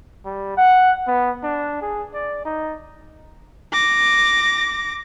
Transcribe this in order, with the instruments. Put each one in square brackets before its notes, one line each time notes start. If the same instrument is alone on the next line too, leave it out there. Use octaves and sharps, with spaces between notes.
[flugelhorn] G3
F#5
B3
D4
G#4
D5
D#4
[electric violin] D6 A#6